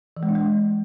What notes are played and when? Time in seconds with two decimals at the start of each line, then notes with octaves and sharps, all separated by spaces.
0.17 E3
0.23 G#3
0.29 D4
0.35 G#3